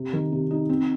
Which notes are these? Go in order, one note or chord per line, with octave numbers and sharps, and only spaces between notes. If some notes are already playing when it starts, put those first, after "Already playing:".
Already playing: C3
D#3
C3
D#4
C4